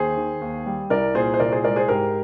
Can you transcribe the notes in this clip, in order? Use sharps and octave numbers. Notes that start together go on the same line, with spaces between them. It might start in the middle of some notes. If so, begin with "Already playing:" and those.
Already playing: D#2 G#4 C5
D#3
D#2
G3
C2 A#4 D5
A#2 G#4 C5
C5
C2 A#4 D5
G#4 C5
G#3 A#4 D5
G#4 C5
G#2 G4 A#4